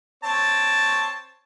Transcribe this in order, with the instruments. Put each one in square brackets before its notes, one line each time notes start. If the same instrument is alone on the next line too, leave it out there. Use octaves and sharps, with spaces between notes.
[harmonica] C4 C#5 A5